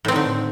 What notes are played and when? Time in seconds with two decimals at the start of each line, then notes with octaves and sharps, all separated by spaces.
0.05 A2
0.08 C4
0.12 D#3
0.16 D3